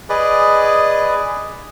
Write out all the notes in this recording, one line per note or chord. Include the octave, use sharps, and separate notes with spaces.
G#4 B4 D5 D#5